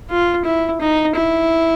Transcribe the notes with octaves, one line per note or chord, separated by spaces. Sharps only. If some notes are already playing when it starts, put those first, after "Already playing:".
F4
E4
D#4
E4